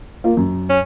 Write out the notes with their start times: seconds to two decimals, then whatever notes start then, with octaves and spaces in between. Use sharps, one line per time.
0.24 A#3 F4
0.37 F#2
0.70 C#4